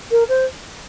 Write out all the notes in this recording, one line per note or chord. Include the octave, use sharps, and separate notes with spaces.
A#4
C5